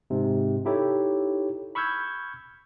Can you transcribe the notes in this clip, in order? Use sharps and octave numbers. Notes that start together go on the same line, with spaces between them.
G#2 C3
D#4 E4 G4 A4 C#5
B5 C#6 E6 F6 G6 G#6